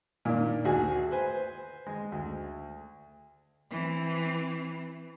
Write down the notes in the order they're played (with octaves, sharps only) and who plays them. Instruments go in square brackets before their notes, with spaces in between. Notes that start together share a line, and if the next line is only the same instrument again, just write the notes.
[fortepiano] A#2 D#3 D4
D2 F#4 G#4
B4 C5 G#5
G#3
D2
[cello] E3 C4